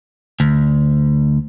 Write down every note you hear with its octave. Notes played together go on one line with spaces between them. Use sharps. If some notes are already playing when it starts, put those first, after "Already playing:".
D2